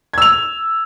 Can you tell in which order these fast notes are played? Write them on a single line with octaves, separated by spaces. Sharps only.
G#6 E6 F7